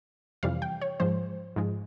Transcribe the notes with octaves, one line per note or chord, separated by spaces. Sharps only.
F2 C3 E3 G3 F5
G5
C#5
G#2 F3 G#3 C5
G#2 F3 G#3